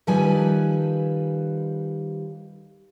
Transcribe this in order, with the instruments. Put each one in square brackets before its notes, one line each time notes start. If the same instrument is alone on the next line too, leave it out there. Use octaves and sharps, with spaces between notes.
[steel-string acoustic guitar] D#3 F3 G3 A4 B4 G#5